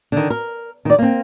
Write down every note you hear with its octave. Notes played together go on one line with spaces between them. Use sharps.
D3 D#3
A#4
D#3 D5
A#3 C4